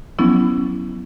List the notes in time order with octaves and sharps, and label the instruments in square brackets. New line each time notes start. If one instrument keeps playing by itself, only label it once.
[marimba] F3 F#3 B3 C#4 E4